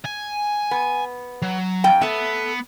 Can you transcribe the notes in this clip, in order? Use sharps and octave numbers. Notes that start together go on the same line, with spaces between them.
G#5
B3
F#3
F2 G5
A3 B3 E5